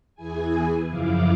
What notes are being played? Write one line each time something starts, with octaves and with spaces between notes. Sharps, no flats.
E2 E3 E4 G#4 G#5
F#2 C#3 F3 E4 F5 D6